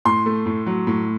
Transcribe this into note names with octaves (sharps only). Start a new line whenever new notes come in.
A2 C6
A3
A2
F#3
A2